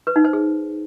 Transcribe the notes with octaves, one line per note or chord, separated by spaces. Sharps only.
B4
D#4
C5
G#4